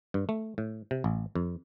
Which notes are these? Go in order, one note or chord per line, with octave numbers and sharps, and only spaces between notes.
G2
A3
A2
C3
A1
F2